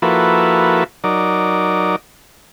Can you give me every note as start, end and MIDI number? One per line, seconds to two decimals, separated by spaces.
0.02 0.84 53
0.02 0.84 58
0.02 0.84 64
0.02 0.84 66
0.02 0.84 69
0.02 0.84 71
1.04 1.96 54
1.04 1.96 63
1.04 1.96 70
1.04 1.96 74